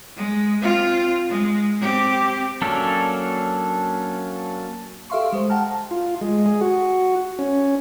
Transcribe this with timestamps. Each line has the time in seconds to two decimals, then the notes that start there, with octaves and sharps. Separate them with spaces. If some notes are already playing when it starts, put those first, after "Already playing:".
0.16 G#3
0.61 C4 F4
1.30 G#3
1.81 C4 G4
2.62 F#3 A#3 C#4 D4 A4
5.10 G4 A4 E5 F5 C6 C#6
5.33 G#3 C5
5.49 F#5 G5 A5 A#5 F6
5.91 F4
6.21 G#3
6.46 G#4
6.61 F#4
7.39 C#4